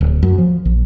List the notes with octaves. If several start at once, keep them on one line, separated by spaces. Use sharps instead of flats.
D1
F#2
F3
A#1